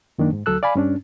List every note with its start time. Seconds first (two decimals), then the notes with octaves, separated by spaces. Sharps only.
0.18 F#2 D#3 A#3 D4
0.33 G#2
0.46 D2 F#3 A4 E6 F#6
0.63 D5 F5 G#5 B5
0.75 G2 C#4 D4